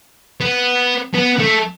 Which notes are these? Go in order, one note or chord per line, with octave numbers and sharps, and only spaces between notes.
B3
B3
A3